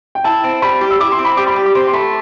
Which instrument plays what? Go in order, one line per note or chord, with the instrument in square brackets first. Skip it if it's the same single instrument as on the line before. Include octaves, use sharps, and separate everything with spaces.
[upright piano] G5
[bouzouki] E4 [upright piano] A5
[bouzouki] C4
[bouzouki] G3 [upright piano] B5
[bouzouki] G4
[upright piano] E6
[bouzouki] E4 [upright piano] D6
[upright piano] C6
[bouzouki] C4
[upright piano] B5
[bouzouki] G3 [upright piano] D6
[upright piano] B5
[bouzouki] G4
[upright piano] D6
[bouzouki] C4 [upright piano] C6
[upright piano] C6
[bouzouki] A3 [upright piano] B5